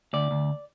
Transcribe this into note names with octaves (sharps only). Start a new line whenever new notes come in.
D2 D5
D2